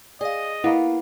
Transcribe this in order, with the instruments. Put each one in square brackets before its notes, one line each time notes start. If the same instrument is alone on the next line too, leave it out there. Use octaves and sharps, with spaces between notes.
[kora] G#4 [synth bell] D5 F5 [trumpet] D#5
[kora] A#3 B3 [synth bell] E4